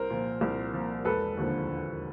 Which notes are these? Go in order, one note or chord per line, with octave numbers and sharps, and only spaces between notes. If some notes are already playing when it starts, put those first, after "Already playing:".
Already playing: C2 A#4 C5
A#2 F3
C2
A#2 F3
E1 A4 B4
D#2 D3 F3
E1